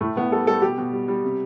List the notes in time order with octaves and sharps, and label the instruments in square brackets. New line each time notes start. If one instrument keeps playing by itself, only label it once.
[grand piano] A2 A3
A2 B3
G3 A4
G3 A4
B2 G4
B2
G3
G3
C3